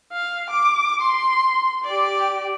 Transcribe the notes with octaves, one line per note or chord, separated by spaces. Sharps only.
F5
D6
C6
G4 D5